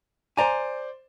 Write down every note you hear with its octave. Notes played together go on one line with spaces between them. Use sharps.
C5 D5 G#5 A#5 D6